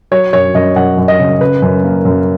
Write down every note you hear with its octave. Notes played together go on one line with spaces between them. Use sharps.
F#3 C#5
F#2 C#5
F#2 D#5
F#2 F#5
F#2
D#5
C#3
C#3 B4
F#2
A#3
F#2